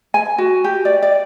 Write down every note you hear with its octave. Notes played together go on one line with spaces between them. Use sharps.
G#5
F#4
G4
D5
D5